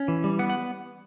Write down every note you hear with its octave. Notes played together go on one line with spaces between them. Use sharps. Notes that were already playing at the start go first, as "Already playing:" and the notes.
Already playing: C#4
E3
G3
B3 F#5
F#5